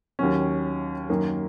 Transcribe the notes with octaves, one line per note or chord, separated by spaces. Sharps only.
D#2 D#3 F#3 C#4
F#2 D#3 A#3